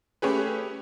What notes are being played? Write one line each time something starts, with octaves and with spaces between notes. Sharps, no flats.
A3 C#4 G4 G#4 B4